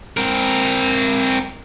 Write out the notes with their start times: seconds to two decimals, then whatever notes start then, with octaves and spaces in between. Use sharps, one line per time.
0.17 C4 A#4